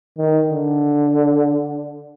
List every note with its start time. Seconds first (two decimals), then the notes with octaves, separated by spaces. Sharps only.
0.18 D#3
0.49 D3